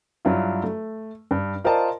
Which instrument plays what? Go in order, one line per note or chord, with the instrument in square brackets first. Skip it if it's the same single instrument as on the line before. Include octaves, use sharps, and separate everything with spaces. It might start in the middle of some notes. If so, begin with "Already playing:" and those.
[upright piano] G2 F#3 E4 F4
A3
G2
F4 A#4 C5 D5 D#5 A5